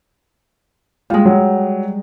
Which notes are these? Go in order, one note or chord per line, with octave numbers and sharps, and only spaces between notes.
G3 G#3 F4
F#3